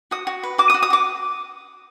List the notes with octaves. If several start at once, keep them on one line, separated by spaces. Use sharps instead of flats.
F#4 D#6
F#4
B4
F#4 D6
D#6
F#4
D#6
F#4 D6